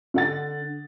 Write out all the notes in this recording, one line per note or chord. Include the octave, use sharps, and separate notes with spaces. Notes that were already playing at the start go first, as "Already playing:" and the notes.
D3 F#5 A6